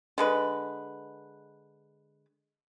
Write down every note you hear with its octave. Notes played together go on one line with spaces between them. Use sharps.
D3 G#3 B4